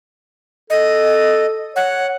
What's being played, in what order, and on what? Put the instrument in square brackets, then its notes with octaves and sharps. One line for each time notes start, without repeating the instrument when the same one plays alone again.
[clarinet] A4 [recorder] D#5
[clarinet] C#5 [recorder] F#5